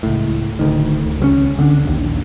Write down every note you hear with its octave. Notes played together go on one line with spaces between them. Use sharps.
C#2 A2
D1 D2 D#3
D2
C#2 F#3 C#4
D3 C4 D4
A#1 D#2